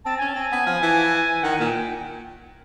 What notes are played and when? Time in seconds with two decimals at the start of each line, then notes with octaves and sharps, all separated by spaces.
0.05 C4 A5
0.18 C#4 G#5
0.29 A5
0.36 C4 G#5
0.52 B3
0.66 F3
0.82 E3
1.43 D#3 F#5
1.57 A#2 G#5
1.67 G5